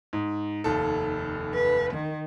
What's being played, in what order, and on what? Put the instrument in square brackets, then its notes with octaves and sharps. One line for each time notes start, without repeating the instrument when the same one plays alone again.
[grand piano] G#2
F1 D#2 A4
[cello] B4
D#3